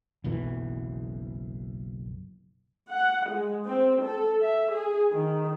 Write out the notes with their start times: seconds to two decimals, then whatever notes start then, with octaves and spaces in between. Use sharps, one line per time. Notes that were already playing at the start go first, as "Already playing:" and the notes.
0.24 F#1 B1 B2 E3
2.89 F#5
3.30 G#3
3.67 C4
4.03 A4
4.42 E5
4.71 G#4
5.11 D#3